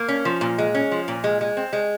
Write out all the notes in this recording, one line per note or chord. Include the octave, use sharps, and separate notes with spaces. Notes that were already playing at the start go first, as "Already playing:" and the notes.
Already playing: A#3
C#4
F3
A#2
G#3
C#4
F3
A#2
G#3
G#3
C4
G#3